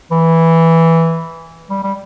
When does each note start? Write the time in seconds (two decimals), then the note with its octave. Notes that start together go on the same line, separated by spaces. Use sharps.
0.12 E3
1.70 G3
1.83 G3